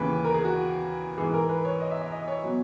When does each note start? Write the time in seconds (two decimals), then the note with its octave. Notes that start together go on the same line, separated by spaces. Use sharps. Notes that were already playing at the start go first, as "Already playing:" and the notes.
Already playing: D#2 C#3 E3 B4
0.25 A#4
0.34 G#4
0.45 F#4
1.17 G#2 E3 G#4
1.33 A#4
1.49 B4
1.65 C#5
1.80 D#5
1.91 E5
2.01 D#5
2.12 D#5
2.28 C#5
2.43 B2 F#3